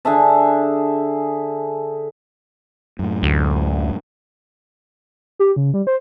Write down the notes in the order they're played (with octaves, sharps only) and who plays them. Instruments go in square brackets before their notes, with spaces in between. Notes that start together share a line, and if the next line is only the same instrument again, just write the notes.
[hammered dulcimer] D3 G#4 E5 A5
[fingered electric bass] F#2 A2
[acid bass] D2
[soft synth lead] G4
C#3
G3
C5